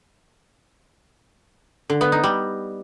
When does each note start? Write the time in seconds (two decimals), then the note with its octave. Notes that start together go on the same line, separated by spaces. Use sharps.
1.90 D3
2.01 B3
2.12 D#4
2.24 G3